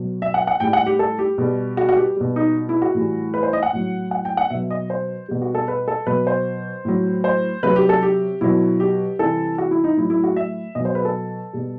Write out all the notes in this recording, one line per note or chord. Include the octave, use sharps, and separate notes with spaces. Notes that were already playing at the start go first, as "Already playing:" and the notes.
Already playing: B2 F#3
E5
F#5
F#5
A2 G3 G5
F#5
G4
A4
G4
B2 G3
F#4
F#4
G4
B2 G3
D#4
E4
F#4
A2 E3 G3
B4
C5
D#5
F#5
A2 F#3
F#5
G5
F#5
B2 F#3 E5
D#5
C5
B2 G3
F#4
A4
B4
A4
B2 F#3 B4
C5
A2 F#3
C5
C3 F#3 B4
G4
A4
G4
B2 F#3 E4
G4
C3 E3 G3 A4
F#4
E4
D#4
A2 F#3 E4
E4
F#4
E5
B2 F#3 D#5
C5
B4
A4
B2 G3